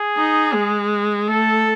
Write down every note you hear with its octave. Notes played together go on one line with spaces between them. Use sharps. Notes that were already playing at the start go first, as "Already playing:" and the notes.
Already playing: G#4
D#4
G#3
A3 A4